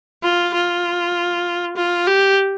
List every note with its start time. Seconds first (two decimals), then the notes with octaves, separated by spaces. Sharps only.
0.23 F4
0.54 F4
1.77 F4
2.07 G4